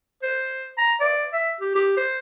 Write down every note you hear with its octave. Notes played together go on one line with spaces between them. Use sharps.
C5
A#5
D5
E5
G4
G4
C5